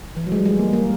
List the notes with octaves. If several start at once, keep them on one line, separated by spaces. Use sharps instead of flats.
E3
F#3
G#3
G3
G#3
A#3
A#3